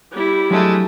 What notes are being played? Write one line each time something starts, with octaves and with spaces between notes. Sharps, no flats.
G3 E4
F#3 G#3 A3 D4 A5